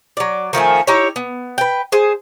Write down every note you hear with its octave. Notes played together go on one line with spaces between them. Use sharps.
F#3 D5
D#3 F3 A3 G#5
D#4 E4 G4 C#5
B3
B4 G5
G#4 C5